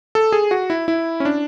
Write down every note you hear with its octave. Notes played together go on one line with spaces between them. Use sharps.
A4
G#4
F#4
E4
E4
C#4
D4